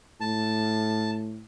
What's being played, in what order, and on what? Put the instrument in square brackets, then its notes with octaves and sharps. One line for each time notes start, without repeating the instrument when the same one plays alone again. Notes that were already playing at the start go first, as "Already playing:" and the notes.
[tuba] A2 [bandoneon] A5